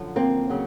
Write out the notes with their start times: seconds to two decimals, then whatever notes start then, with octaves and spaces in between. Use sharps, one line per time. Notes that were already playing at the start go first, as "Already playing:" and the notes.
Already playing: F#2 D3 F3
0.16 A#3 C4
0.50 C#3 F#3